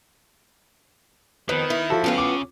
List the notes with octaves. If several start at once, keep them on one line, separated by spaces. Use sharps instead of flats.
F2 D#3 B3 D#4 B4
E4
F3 F#4 A4
A2 C#3 B3 C#4 F4
D6